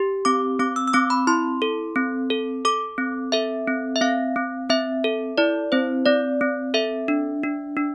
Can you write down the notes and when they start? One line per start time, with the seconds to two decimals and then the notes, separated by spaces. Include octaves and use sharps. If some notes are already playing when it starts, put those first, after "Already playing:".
Already playing: G4
0.25 C4 D6
0.60 C4 D6
0.76 E6
0.88 E6
0.93 C4 D6
1.10 B5
1.27 E4 C6
1.62 A4
1.96 C4
2.30 A4
2.65 A4 D6
2.98 C4
3.32 A4 E5
3.68 C4
3.96 E5
4.01 C4 F5
4.36 C4
4.69 C4 E5
5.04 A4
5.38 E4 D5
5.72 C4 C5
6.06 C4 D5
6.41 C4
6.74 A4 E5
7.08 D4
7.43 D4
7.77 D4